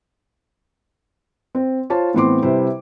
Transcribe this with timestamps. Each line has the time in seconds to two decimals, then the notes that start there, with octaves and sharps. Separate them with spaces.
1.55 C4
1.90 F4 C5 C#5 A5
2.14 A2 E3 B3 C4 C6 D6
2.42 C3 G3 E4 B4 C5